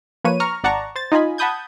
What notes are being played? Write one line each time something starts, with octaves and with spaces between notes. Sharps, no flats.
F3 A#3 B4 C#5 D#7
A#5 C#6 F6
G#1 D5 F#5 A5 A#5 C#6
C5 A6
D#4 F4 D#5 G#5 B5
F#5 A5 B5 D#6 G6 G#6